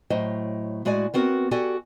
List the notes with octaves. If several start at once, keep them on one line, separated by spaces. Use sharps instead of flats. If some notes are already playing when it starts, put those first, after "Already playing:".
A2 F#3 C5 D#5 G5
A2 G#3 F#4 D5 G#5
B3 C4 F#4 A#4
F#4 G4 A4 D5 G5 G#5